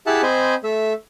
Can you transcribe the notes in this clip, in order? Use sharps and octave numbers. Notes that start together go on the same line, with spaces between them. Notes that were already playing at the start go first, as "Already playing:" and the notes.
E4 G4 G#4 E5 F#5 A5
C4 C5 D#5 G#5 B5
A3 E5